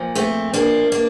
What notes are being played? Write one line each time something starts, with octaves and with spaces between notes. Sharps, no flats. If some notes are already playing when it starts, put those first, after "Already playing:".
Already playing: A#2 F3
A3 C4
A#3 D4
A#3 D4